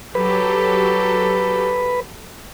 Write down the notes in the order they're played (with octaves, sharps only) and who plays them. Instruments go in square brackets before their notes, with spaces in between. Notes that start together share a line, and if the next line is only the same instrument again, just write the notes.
[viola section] F#3 G4 A4 [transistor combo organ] B4